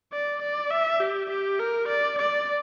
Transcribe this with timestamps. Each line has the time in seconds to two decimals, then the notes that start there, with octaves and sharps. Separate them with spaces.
0.12 D5
0.42 D5
0.70 E5
1.00 G4
1.29 G4
1.59 A#4
1.88 D5
2.18 D5